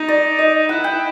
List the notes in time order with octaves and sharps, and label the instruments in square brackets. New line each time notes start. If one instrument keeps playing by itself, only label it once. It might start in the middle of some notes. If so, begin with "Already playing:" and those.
Already playing: [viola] D#4
[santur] D5
D#5
[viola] E4 [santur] F#5
[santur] G5